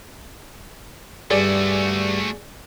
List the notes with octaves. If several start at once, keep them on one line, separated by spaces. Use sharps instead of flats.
G2 A3 F#4 G#4 D5